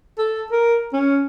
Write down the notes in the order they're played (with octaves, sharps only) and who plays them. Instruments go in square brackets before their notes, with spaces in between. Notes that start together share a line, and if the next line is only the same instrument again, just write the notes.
[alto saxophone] A4
A#4
C#4